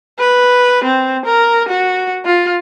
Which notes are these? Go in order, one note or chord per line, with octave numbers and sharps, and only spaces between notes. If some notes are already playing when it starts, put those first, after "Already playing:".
B4
C4
A#4
F#4
F4